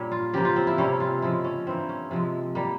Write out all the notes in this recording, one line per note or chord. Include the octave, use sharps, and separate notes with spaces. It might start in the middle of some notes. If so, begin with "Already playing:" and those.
Already playing: G2 A#2 G3 A#3 C#4
F4
C#3 F3 A#3 G4
F4
C4
E4
C3 G3 A#3 C#4
F4
C#3 F3 G#3 E4
C#4
G2 E3 A#3 C4
C#4
C3 F3 G#3
G3 A#3